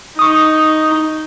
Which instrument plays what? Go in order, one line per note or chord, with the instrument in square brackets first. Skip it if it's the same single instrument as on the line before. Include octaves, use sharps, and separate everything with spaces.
[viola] D#4 [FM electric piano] C#6 D#6